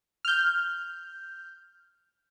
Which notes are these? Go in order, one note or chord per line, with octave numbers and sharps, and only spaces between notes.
F6 G6